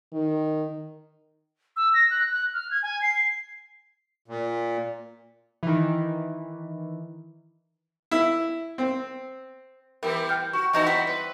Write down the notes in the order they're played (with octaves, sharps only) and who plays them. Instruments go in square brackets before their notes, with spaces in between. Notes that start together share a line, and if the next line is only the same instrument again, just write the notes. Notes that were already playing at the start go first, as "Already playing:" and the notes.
[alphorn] D#3
[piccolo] E6
A#6
F#6
F#6
F6
G#6
G#5
C7
[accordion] A#2
[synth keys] D#3 E3
[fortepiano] E4
C4
[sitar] E3 B3 G4 [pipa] G3 [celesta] A#4
[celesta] G5 F6 G6
[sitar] F#4 [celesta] C#6
[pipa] C3 D#4 A#5 [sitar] E3 B3 F#4
[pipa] G3 C4 [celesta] B6
[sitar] B4